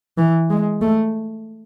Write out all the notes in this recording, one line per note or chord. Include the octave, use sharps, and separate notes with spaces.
E3
G#3
A3